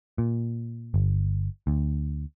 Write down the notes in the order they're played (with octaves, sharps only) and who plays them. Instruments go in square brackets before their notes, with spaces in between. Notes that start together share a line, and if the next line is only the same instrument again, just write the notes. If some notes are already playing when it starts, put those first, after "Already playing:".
[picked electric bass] A#2
G1
D2